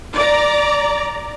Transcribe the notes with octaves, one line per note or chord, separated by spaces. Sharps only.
D5 A#5